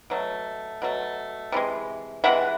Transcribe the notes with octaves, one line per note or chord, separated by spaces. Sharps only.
B2 F#3 A3
B2 F#3 A3
C3 E3 G#3
C3 E3 G#3 E5 F#5